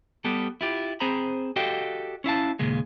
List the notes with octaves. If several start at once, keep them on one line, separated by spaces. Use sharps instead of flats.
G3 B3 G4 A4
E4 F4 G4
C4 G#4 C5 A#5 B5
F#4 G4 A4 D#5 F5 G5
C#4 E4 F5 A5
D#2 A#2 C#3 G#3